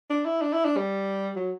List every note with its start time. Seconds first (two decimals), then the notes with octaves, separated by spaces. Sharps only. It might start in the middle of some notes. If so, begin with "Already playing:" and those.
0.10 D4
0.25 E4
0.42 D4
0.53 E4
0.65 D4
0.77 G3
1.36 F#3